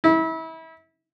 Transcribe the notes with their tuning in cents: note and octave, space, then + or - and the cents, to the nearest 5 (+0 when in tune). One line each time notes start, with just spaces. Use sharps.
E4 -30